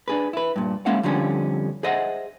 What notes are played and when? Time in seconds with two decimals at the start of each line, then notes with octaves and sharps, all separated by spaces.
0.08 D4 G#4 B4
0.33 E4 B4
0.56 G2 A#2
0.86 G#3 A#3 C#4 E4 F5 F#5
1.03 F2 D3 F3 G3 C#4
1.83 G#4 C5 D#5 E5 F#5